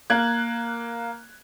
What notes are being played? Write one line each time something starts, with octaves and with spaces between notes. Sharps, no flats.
A#3 F#6 G#6